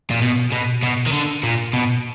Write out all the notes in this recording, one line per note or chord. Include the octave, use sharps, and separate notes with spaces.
A#2
B2
B2
B2
D#3
D3
A#2
B2